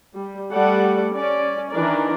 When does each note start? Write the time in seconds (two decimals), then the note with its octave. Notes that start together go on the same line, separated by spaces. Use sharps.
0.14 G3
0.52 G3 A3 A4 D5 F#5
1.12 C#4 D5
1.71 D#3 E3 D4 A#4 D5